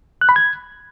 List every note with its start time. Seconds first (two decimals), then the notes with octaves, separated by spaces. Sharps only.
0.21 F#6
0.29 B5
0.36 G#6